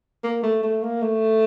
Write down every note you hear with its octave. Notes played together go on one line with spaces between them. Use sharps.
A#3
A3
A3
A#3
A3